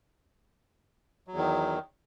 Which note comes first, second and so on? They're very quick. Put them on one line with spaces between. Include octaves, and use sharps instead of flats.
F#3 E2 D#3